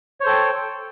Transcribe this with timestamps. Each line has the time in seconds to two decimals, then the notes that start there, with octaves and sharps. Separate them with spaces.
0.21 C#5
0.23 C5
0.26 A4
0.29 G5